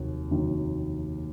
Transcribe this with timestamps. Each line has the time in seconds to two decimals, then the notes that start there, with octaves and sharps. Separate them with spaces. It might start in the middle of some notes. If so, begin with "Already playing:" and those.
Already playing: F1 D#2 D#3 F#3
0.31 F1 D#2 D#3 F#3